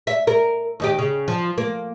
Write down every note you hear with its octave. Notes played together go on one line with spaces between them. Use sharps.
E5
A#4
D#2 D#4 G4
C#3
F3
A#3